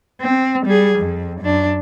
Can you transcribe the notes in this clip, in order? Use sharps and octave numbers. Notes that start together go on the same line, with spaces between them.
C4
G3 G#4
F2
F#2 D4